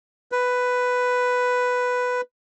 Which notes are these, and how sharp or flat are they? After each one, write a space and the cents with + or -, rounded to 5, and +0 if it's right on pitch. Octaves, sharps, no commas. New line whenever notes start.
B4 +5